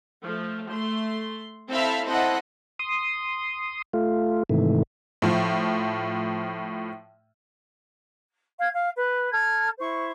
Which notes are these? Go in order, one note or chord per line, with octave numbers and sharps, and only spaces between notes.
F3 A3
A3 C6
C4 E4 A4 E5 F5 B5
C4 E4 A4 C5 D#5 F#5
C6 D#6
A3 F4
G#2 C3 D#3 E3 A3
A2 F3
F5 G#6
F5
B4
A4 F6 G#6
E4 C5 C#6